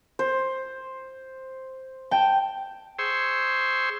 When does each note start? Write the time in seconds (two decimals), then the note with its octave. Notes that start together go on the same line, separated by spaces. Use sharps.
0.19 C5
2.11 G5 A5
2.99 G#4 C5 C6 C#6 E6